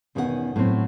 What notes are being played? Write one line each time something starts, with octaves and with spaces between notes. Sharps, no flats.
E2 B2 D#3 C#4 G#4 F#5
A2 F#3 C4